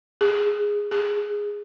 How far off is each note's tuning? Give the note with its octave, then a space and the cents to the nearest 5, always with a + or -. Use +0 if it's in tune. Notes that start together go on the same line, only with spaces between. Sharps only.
G#4 -5
G#4 -5